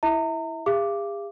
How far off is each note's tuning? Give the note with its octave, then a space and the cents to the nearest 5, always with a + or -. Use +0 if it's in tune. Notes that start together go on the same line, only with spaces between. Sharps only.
E4 +0 E5 -25 A#5 -35
G#4 -45 F5 -40 D6 +0